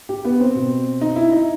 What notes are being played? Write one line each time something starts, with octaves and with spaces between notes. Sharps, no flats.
G4
B3
C4
B2
D#4
E4
D#4